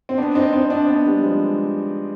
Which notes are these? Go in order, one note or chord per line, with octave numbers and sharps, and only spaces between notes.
C4
B3 D4
C4 D#4
C4 D#4
B3 D4
B3 D4
G3 B3
F3 G#3